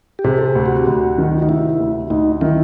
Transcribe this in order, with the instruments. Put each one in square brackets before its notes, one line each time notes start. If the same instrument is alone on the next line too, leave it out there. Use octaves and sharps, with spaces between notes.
[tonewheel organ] G4
[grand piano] C3 [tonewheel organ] G#4
[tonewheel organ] A4
G#4
[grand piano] D2
[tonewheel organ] F#4
[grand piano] D2
D#3
[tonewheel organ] D#4
[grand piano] C3 [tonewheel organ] E4
[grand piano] D2
[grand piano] D2 [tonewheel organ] D#4
[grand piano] D#3 [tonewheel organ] E4